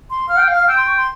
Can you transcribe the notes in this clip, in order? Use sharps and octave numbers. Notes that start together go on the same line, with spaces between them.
C6
F5 F6
G5
F5
F6
F5
G5 E6
C6
C#6
C6